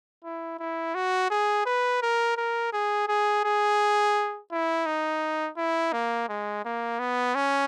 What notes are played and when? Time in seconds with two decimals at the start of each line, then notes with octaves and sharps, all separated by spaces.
0.24 E4
0.59 E4
0.95 F#4
1.30 G#4
1.66 B4
2.02 A#4
2.37 A#4
2.73 G#4
3.08 G#4
3.45 G#4
4.52 E4
4.86 D#4
5.57 E4
5.93 A#3
6.29 G#3
6.65 A#3
7.00 B3
7.35 C#4